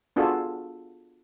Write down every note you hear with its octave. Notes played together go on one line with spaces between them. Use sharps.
B3 D4 F4 F#4 G#4 A4